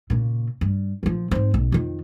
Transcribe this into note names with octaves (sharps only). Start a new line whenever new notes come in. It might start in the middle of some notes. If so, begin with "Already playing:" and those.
A#2 C#3
G2
A#2 F3
G#2 C4
B1
F2 D#3